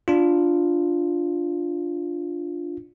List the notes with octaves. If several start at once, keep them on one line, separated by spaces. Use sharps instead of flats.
D4 F4